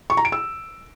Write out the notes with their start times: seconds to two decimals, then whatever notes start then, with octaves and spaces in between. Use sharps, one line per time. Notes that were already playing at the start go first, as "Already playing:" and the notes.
0.10 C#6
0.17 A#5
0.25 D7
0.32 E6